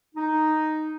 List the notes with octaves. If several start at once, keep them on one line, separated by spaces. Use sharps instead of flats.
D#4